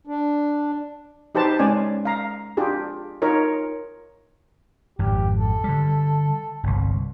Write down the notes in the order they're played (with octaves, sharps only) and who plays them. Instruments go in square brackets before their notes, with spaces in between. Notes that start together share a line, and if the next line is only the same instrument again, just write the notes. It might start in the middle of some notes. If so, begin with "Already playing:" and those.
[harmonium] D4
[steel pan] D#4 G4 B4 C5 A5
G#3 C#4 D5 G#5
F5 A#5
D4 F4 G4 G#4
D#4 F4 A#4 C#5
[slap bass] G#1 F2 [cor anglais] G4
[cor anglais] A4
[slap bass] D3 G3
G1 C2